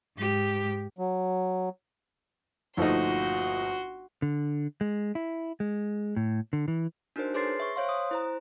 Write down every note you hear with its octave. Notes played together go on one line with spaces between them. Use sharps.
G#2 G4
F#3
G1 A#2 F3 A3 D#4 F#4 C6
D3
G#3
E4
G#3
A2
D3
E3
D4 D#4 F#4 A#4 C5
G#4 B4 C#5 C6 A6 C7
E5 C#6
C5 C#5 F5 C6
D#6
E4 C5 A#5